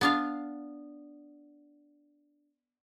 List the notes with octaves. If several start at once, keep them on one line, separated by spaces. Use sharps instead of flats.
B3 D4 F5